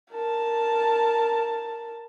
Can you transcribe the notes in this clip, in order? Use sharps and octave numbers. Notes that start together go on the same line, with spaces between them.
A#4 A5